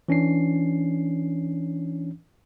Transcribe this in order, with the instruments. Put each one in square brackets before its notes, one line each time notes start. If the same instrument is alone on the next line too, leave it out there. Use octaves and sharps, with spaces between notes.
[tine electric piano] E3 C#4 D4 C7